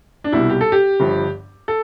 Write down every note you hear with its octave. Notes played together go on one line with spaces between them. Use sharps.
D4
C2 B2 G3 E4
G4
A4
G4
G1 G2 F3
A4